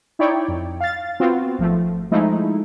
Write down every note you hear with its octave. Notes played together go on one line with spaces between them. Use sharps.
D#4 E4 C#5 D5 G5
F2
F5 A6
B3 C4 F4 F#4
G#1 F3 A3
F3 G#3 A3 D#4 E4